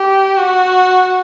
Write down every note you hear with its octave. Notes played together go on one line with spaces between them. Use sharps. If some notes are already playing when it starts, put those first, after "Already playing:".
Already playing: G4
F#4